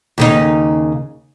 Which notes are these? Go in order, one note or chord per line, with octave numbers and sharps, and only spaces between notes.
D#2 C#3 D#4